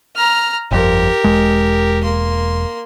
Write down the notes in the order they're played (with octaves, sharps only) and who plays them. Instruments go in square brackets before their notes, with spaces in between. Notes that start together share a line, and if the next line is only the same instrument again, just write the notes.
[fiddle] A#5 F6
[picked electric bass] G1 F2 [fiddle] G4 A#4
[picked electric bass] E1 G#3
[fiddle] A#3 C6